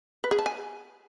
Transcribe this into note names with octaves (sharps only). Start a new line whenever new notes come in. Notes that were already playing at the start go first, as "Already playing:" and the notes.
B4
G#4
A5
G#5